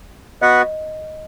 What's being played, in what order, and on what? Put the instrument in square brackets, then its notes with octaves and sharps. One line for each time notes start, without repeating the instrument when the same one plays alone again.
[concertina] B3 F#4 B4 F#5 [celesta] D#5